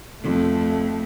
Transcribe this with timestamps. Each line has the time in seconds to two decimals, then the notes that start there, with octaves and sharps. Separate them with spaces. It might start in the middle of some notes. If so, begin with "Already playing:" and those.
0.23 F2 A3